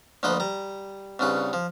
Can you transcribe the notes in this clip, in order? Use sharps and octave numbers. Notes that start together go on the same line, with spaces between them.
D2 A#2 F3 B4 D#5 B5
G3 A#5
C2 G2 C#3 C#4 B4
F3